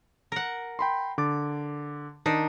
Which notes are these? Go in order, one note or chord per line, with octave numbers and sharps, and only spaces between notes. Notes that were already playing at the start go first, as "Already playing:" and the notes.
A#4 F#5
G5 B5 C6
D3 D6 A6
D#3 D4 D#4